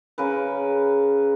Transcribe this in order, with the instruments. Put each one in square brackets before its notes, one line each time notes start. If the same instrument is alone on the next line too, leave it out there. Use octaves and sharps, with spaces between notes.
[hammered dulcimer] C#3 A#4 B4